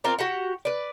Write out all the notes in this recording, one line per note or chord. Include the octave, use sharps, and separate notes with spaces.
C4 F4 A#4 D5
F#4 G4 F#5
B4 D5